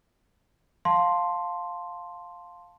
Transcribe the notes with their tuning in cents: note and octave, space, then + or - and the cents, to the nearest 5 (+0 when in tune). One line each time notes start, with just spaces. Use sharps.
F5 +10 A5 +5 C6 +0